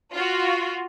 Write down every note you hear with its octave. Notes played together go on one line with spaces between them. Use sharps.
F4 F#4